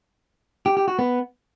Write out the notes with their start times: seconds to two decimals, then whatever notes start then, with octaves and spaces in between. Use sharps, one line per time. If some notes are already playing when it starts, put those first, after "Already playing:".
0.66 G4
0.77 G4
0.88 F#4
0.99 B3